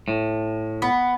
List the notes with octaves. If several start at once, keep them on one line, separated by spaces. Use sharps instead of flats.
A2
B3